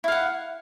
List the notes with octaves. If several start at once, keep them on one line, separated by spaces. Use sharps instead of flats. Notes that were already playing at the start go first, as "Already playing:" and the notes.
E4 F5 F#5